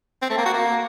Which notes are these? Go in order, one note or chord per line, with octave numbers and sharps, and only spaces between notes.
C4
A3
A#3
F#4
A#3